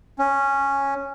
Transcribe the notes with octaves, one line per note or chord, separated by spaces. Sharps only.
C#4